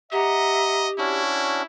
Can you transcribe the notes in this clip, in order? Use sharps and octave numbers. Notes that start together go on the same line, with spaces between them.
G4 D#5 E5 F#5 A#5
C#4 D4 E4 F#4 G#6